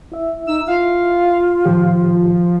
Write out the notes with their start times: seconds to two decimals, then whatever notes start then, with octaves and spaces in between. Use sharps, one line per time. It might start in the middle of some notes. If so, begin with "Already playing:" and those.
0.12 E4 E5
0.47 D#4 E6
0.67 F4 F5
1.65 A2 D#3 F3 G4